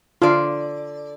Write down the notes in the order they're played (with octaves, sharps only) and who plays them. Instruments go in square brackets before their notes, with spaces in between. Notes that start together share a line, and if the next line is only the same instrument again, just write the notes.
[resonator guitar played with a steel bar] D3 D5 [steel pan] F4